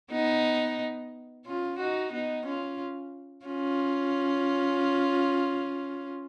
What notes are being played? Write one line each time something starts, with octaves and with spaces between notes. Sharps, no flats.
B3 D#4
C#4 F4
D#4 F#4
B3 D#4
C#4 F4
C#4 F4